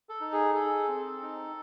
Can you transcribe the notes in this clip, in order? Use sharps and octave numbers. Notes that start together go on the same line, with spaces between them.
A4
D#4
G#4
G#4 A4
C4
D#4